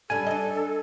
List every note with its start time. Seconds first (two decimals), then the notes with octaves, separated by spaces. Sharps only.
0.10 C#3 G3 D4 A4 G#5
0.26 D4 D#5